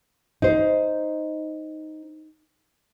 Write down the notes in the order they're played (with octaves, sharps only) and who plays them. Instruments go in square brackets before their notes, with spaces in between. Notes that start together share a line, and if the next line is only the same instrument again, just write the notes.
[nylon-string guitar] D#4 C5